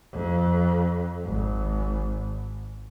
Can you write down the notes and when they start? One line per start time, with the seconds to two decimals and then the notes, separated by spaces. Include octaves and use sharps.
0.13 F2
1.25 G#1